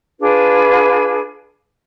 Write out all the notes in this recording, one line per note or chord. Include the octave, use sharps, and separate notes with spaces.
D4 F4 G#4 B4